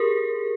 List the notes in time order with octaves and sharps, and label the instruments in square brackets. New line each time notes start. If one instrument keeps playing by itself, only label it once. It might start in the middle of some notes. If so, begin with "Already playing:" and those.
Already playing: [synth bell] G4 G#4 A#4